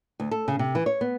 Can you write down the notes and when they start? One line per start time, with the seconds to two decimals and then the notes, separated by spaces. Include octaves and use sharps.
0.20 D2
0.31 A4
0.48 C#3
0.59 C3
0.75 E3
0.86 C#5
1.01 B3